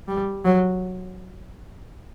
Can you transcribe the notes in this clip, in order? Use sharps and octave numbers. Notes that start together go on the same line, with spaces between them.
G3
F#3